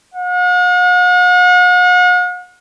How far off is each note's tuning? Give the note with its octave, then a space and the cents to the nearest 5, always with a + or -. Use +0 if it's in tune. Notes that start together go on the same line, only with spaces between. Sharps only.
F#5 -45